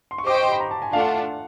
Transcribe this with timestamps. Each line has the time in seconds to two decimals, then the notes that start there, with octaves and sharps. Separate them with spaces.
0.11 C6
0.18 C#6
0.26 G4 C5 D#5 G5 D6
0.35 C#6
0.43 C6
0.52 B5
0.60 A#5
0.71 A5
0.82 G#5
0.93 A3 D4 F4 F5
1.00 F#5
1.08 F5